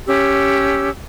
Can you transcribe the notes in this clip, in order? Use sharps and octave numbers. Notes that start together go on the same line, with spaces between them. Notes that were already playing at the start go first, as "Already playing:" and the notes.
C#4 G4 E6